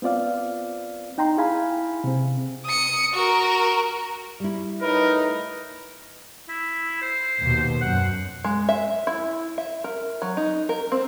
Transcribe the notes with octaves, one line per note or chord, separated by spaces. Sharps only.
B3 C4 F4 D5 F5
D#4 G5 A#5 C6
E4 G#4 F5 G#5 B5
C3 C4
D#6 C#7
F#4 A#4
G3 E4
A2 D#4 A#4 B4
E4
C5
D#2 B2
F#2 F#5
G#3
E5
E4
E5
A#4
F#3
D#4
A#4
C4